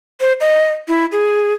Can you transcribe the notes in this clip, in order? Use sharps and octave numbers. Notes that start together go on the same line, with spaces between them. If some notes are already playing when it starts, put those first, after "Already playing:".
C5
D#5
E4
G#4